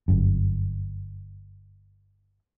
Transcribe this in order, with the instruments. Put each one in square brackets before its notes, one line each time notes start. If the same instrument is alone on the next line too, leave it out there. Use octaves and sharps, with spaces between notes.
[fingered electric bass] G1 F#2